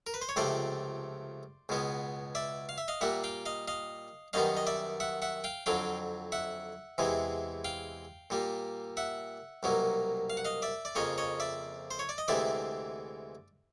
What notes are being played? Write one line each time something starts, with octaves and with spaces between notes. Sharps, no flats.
A#4
B4
C5
C#5
C#2 C3 F3 A3 C5 D5
C#2 B2 G#3 B3
D5 E5
F5
E5
D#5 F5
A#2 G3 A#3 E5 F#5
F5 G5
D#5 F5
D#5 F5
F#2 D#3 G3 B3 D#5 F5
D#5
D5 E5
E5 F#5
E5 F#5
F5 G5
F2 D3 F#3 F5 G5
E5 F#5
E2 C3 E3 G#3
F5 G5
A#2 G3 A#3
E5 F#5
C2 B2 F#3 A#3
F5
F#5
D#5 F5
D5 E5
D5
F2 C#3 F3 A#3 C#5 D#5
C#5 D#5
D5 E5
C5
C#5
D5
D#5
D2 C3 E3 G#3 D5 E5